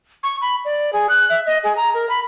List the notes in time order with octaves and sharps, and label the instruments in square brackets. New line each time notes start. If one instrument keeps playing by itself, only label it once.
[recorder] C#6
B5
D5
G#4
F#6
E5
D#5
G#4
A#5
A#4
B5